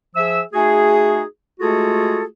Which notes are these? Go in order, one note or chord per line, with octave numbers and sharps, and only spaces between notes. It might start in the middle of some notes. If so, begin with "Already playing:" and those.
F3 G#4 E5 E6
A3 D#4 F#4 G#4
G#3 A3 F4 F#4 G#4 A4